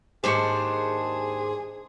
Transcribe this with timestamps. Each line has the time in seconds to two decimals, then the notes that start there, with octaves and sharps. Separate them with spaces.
0.24 D#2 G#2 D4 G4 G#4 C5 C#6